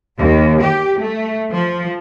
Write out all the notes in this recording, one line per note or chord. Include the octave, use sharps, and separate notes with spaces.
D#2
G4
A3
F3